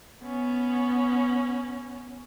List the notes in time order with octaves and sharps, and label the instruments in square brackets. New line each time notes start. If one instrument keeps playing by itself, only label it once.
[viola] B3 C#4